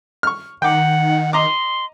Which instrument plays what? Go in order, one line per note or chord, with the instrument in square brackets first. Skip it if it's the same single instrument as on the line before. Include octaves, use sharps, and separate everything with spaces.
[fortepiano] C#6 F6
[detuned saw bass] D#3 [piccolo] F#5 [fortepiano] G5 D6
[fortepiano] D#5 A#5 D6 [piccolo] C6